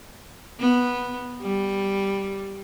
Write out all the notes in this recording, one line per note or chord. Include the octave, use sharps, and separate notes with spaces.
B3
G3